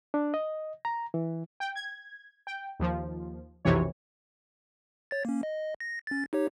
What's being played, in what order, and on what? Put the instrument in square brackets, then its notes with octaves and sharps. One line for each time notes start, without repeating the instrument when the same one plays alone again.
[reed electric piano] D4
D#5
A#5
E3
[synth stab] G5
G#6
G5
D#2 F3
B1 F2 C3 E3 C#5
[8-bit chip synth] C#5 A6
A#3 C#4
D#5
A#6
C#4 A6
D#4 G4 C#5